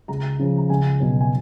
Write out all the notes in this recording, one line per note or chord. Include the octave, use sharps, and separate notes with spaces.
C#2 A#5
C#3 F3
A#5
C#2 G#5
B2 F#3
G#5